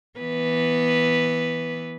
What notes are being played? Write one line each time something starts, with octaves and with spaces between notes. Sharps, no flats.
E3 B3 B4